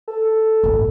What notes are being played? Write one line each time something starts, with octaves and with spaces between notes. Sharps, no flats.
A4
A#1 G#2